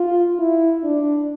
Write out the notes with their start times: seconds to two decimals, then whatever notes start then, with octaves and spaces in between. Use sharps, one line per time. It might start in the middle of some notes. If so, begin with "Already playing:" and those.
Already playing: F4
0.39 E4
0.84 D4